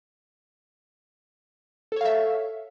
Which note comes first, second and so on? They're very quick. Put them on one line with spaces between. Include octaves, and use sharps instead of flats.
A4 C#5 F5 E5